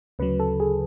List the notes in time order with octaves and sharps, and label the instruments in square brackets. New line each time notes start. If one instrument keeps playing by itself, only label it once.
[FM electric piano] D2 C#3 F#3 B4
A4
G#4